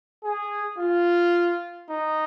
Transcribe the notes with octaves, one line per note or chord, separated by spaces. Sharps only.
G#4
F4
D#4